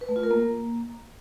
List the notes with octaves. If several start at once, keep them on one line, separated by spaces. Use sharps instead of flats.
B4
A3
F4
A#4
A#3